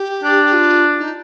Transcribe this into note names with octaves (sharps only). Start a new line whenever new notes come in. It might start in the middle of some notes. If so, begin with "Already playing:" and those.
Already playing: G4
D4
F4
D#4